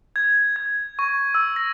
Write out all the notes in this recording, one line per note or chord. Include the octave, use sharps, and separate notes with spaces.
G#6
G#6
C#6
E6
A#6